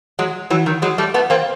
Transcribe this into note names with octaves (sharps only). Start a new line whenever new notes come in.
F#3 G#3
E3 F#3
D#3
F#3 G#3
G3 A3
A3 B3
A#3 C4